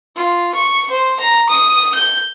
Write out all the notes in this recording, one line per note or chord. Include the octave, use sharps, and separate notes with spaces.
F4
C#6
C5
A#5
D#6
G6